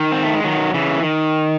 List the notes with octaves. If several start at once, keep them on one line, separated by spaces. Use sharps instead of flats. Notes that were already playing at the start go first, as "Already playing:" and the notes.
Already playing: D#3
C4
A3
G#3
D#3 F#3
C#3 E3
D#3